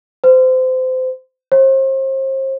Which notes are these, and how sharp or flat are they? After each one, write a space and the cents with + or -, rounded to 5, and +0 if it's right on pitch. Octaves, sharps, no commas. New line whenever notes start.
C5 -25
C5 +35